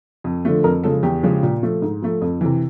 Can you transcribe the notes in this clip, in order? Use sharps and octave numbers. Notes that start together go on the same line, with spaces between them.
F2
D3 F3 A3
F2 A#4
C#3 F3 G#3 A4
E2 G4
C#3 F3 G#3
A#2
F3 A3
G#2
F3 A3
F2
C3 E3